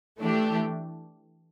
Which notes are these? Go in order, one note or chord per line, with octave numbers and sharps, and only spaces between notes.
E3 A3 D4 G4